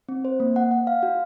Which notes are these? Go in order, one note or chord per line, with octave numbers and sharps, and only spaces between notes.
C4
C5
A#3
F#5
F#5
F5
F#4